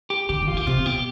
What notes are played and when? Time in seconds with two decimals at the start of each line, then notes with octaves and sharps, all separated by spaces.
0.10 G4
0.29 D3 G4
0.42 D#3
0.47 F4
0.54 D3 G4
0.66 C3 F4
0.85 B2 G4